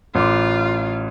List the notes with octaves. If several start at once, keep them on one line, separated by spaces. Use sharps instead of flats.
A1 F4 C6 D6